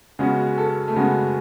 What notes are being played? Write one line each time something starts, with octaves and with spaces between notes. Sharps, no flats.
C#3 G#3 B3 C#4 F#4
A4
A3
C#3 G#3 B3 C#4 F#4